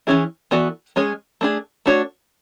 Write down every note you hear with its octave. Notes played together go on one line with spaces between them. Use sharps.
E3 G#3 C#4 E4 G#4
E3 B3 F#4 A4 D5
G#3 C#4 G#4 C#5
A3 D4 G#4
A3 D4 F#4 C#5